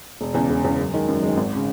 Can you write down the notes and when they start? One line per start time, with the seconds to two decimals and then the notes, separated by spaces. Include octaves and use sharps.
0.21 E1
0.34 E2 C#3
0.49 E1
0.64 E2 C#3
0.79 F#2
0.94 D#3 G#3
1.08 F#2
1.23 D#3 G#3
1.37 G#1
1.56 C#3